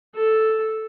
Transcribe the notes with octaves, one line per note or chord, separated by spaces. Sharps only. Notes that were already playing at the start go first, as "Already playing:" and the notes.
A4